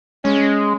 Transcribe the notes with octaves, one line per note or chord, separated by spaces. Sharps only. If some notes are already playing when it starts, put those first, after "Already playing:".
G#3 C#4